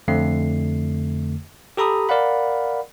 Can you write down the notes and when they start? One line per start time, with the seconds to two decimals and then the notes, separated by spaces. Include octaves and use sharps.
0.08 F2 D3 A3 C7
1.77 G4 A4 A#5 B5 D#6
2.09 A#4 D5 F5 F#5 B5